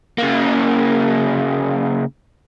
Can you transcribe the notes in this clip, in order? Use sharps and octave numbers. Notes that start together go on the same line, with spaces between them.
C#3 A#3